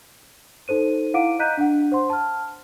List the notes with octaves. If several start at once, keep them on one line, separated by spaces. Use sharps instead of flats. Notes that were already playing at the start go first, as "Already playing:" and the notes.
D#4 A4 C5 D#7
E4 F5 F#5 D6 D7 D#7
D#5 A#5 F#6 G6 B6 D#7
D4 F#5
C5 F#5 C6
A5 F6